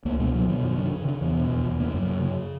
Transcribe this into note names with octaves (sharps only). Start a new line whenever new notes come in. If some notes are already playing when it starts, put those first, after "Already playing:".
C#2 A#3
B2 G#3
B2 F#3
B2 D#3
F#2 D#3
C#3 E3
D#3
C#3
D#3
C#3
E2 E3
B2
E2
E2
C#3 A#3
F#2
C#3
C#3